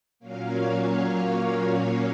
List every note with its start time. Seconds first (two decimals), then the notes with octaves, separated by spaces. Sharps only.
0.19 A#2 F#3 A#3 C#4 F5
0.48 C#5
0.76 F5